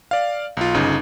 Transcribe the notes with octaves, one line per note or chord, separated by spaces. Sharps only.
D5 F5
B1 F4
G1 C#3 D#4